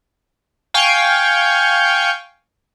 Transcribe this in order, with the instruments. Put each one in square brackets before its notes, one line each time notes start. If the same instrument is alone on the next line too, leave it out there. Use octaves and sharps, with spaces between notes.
[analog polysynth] F5 G5 G#5 C#6